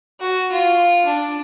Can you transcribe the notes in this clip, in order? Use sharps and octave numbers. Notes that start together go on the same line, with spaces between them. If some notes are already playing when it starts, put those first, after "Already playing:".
F#4
F4
D4